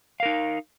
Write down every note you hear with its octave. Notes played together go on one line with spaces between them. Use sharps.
D#4 A#4 F5